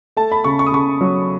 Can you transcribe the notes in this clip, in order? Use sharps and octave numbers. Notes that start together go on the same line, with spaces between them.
A3 A5
B5
C#3 C#6
C#6
D#6
C#3 C#6
F#3